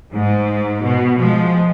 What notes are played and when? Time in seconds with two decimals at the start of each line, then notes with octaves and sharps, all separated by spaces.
0.12 G#2
0.83 B2
1.17 F3 G#3